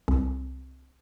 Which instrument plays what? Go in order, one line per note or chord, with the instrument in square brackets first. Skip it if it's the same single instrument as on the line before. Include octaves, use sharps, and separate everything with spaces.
[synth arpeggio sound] C2